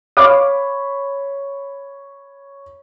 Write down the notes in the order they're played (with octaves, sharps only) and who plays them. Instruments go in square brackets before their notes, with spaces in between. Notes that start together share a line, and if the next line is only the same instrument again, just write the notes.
[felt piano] C#5 B5 [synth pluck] F5 D6